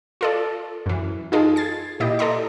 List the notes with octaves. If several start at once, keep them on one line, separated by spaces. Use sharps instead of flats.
F4 A4 D5
F#2 E3
D#4 F4 G#4 A4
G#6 A6 C7
A#2 E4 G4 D#5
A4 D5 D#5 A#5 C6